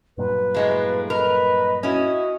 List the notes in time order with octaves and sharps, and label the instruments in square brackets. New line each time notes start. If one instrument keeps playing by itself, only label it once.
[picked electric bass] G2 A#2 F#3 [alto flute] B4
[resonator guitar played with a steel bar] A2 G#3 A#3
[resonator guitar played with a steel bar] A#4 [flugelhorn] B4 [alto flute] D#5
[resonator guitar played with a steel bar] C#4 E4 [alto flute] F#4 [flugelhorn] D#5